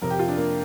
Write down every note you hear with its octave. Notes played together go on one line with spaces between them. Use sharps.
F2 C3 A#4
G4
F4
D4
A#3